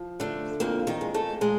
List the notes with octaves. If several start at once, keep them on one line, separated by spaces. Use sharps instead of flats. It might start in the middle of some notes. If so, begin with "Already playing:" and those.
Already playing: F3
D3 A3
F2 A#2 A#3
D#3 D#4
G#3
A3 A4
A#2 G#3 G#4